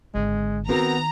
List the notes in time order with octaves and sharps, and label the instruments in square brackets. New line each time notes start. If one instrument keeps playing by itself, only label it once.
[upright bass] G#1 D3 [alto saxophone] G#3
[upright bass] D#3 [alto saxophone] B3 [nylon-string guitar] C4 F#4 A#4 [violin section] A#5